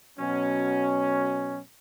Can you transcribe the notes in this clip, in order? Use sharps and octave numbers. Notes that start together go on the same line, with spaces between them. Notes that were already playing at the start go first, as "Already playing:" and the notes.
B2 F#3 C#4